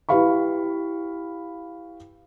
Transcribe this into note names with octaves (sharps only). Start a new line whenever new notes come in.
E4 G4 B4 F5 B5 C#6